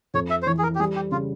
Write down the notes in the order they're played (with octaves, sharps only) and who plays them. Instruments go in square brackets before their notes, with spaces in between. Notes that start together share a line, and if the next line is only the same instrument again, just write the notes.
[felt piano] F2 [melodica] C#5
[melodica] E5
C5
[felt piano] E3 [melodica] C#5
[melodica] G#4
A#4
G4
[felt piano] G3 [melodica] G#4
[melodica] G4
[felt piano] C#3 [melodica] F4